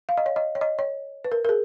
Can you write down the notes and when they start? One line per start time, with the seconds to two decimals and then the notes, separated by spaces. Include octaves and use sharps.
0.09 F5
0.17 D#5
0.26 C#5
0.36 D#5
0.55 C#5
0.61 D#5
0.79 C#5
1.24 B4
1.32 A#4
1.45 A#4
1.49 G#4